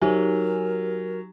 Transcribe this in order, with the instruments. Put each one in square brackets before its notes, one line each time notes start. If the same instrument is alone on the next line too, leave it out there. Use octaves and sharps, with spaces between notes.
[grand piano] F#3 [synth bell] D#4 G4 G#5 [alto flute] A#4